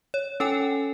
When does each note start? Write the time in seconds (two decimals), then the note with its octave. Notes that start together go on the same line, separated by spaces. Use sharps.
0.14 C#5
0.40 C#4 A4 G5 G#5